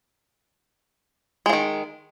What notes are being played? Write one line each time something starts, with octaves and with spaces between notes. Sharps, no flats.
D#3 F3 G#3